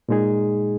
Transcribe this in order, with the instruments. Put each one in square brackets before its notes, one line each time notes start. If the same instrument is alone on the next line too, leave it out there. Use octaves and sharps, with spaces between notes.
[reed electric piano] A#2 G#3 D#4 G#4